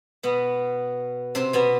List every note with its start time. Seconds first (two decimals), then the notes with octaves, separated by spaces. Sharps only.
0.23 B2 B3
1.35 C3 C4
1.53 B2 B3